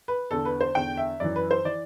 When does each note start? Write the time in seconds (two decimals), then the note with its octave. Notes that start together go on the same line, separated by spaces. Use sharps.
0.08 B4
0.31 E2 D3 A4
0.45 B4
0.61 C5
0.75 E2 D3 G5
0.97 E5
1.20 F#2 E3 D5
1.36 B4
1.51 C5
1.65 E3 D5